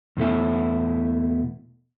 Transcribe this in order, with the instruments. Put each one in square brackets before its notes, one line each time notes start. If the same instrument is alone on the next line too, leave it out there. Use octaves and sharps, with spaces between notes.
[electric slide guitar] E2 B2 A3 E4